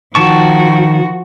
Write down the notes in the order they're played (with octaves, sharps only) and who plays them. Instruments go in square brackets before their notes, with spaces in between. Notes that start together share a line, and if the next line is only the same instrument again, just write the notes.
[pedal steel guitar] D#3 A5 C#6 [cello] F3 F#4